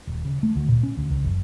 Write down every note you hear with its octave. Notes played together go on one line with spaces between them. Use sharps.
D#1
C#3
A3
D2
A#2
C#4
D2
C#2
F#1